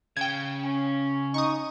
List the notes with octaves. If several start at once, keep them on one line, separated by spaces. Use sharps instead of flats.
C#3 G5 G#6
C#4
D#4 C#6 D#6